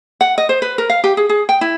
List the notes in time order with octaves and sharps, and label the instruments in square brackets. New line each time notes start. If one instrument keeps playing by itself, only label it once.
[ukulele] F#5
D#5
C5
B4
A#4
F5
G4
G#4
G#4
G5
E4